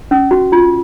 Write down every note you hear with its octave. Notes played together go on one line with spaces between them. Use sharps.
C#4
F#4
F4